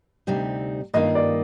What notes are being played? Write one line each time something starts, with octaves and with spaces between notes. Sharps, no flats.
D2 C3 G3 C4 D#4
G2 D#3 A#3 F4 D#5
D5